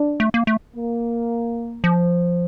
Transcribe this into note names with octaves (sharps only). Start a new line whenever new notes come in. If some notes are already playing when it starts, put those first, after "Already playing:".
Already playing: D4
A3
A#3
A3
A#3
F3